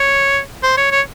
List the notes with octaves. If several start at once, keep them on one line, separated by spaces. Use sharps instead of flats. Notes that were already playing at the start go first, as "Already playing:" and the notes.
Already playing: C#5
C5
C#5
C#5